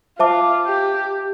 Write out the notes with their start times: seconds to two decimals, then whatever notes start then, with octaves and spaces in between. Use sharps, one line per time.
0.19 F4 C5 E5 A5 D6
0.66 G4